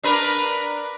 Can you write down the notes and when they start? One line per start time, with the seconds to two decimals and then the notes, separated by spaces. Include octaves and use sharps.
0.03 D4 A#4 B4